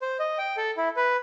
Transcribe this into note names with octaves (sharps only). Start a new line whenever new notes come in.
C5
D#5
G5
A4
E4
B4